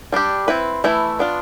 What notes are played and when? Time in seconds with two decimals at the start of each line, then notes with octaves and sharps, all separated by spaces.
0.12 G3 D4 G4
0.48 C4 E4 B4
0.84 E3 A3 E4
1.19 B3 D4 F4